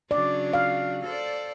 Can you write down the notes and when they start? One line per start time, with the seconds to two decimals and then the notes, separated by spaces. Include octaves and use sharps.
0.11 C#3 F#3 D4 D5
0.53 F5
1.04 A4 C5 D5